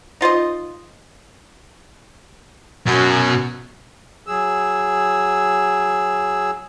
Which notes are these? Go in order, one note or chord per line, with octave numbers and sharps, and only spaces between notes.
D#4 F4 C5 D#5
F#2 B2 F#4
F#3 G#4 E6